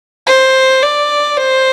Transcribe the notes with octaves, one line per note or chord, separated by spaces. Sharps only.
C5
D5
C5